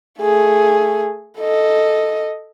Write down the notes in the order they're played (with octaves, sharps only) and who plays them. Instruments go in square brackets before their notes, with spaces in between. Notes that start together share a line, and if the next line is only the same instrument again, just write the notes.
[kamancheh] A3 G#4
A4 D#5